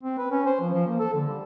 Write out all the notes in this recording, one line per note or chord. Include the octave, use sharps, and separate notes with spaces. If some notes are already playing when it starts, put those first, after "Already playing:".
C4
B4
C#4
C5
F3
F3
A#3
A4
D3
G3